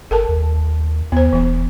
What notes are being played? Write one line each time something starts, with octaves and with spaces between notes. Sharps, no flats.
G1 A4 A#4 A5
D#2
D#2 B3 C5
E1 E3 B3